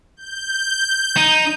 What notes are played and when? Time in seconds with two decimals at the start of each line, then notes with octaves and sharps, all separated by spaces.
0.17 G6
1.17 D#4